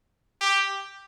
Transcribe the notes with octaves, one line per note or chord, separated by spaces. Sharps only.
G4